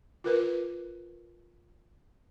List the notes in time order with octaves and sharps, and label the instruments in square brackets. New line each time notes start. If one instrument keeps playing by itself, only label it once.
[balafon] F4 A#4 B4